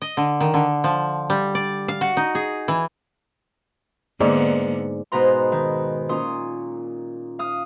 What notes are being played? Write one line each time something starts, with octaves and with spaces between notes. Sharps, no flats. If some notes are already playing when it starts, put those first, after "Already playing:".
D#5
D3
D#3
D3
F3
G3
D5
F5
F#4
D#4
G#4
E3
G#2 D3 A#3 B3 D5
G#2 B2 B4 A#5 C6
D#3
A#2 C#4 C6 D#6
F5 D#6 F6